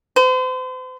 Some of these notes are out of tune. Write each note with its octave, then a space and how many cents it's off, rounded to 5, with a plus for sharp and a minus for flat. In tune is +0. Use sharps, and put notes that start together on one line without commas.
C5 -40